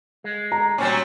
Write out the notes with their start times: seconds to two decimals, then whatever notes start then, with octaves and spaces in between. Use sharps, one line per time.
0.24 G#3
0.52 A#5
0.78 A#2 F#3 G3 C4 C#4